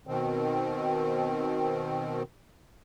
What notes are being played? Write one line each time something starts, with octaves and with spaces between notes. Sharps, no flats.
B2 D#3 C4